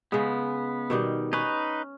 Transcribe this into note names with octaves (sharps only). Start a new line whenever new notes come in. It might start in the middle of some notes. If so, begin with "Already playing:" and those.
C#3 G#3 B3
B2 D#3 G3
C#4 D#4 B4